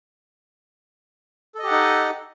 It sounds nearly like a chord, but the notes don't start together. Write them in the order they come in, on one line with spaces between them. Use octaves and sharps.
A4 D#5 G4 F#5 D#4